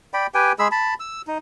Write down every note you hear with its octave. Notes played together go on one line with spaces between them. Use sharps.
D5 G5 B5
G4 B4 G5 G#5
G#3 G#4 B5 E6
A5 B5
E6
D#4